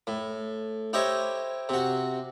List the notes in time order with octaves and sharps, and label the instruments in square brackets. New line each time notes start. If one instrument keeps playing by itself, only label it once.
[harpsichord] A2
E4 G4 C5 C#5 D#5
C3 F#4